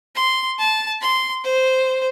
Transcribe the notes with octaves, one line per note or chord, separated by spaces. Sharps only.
C6
A5
C6
C5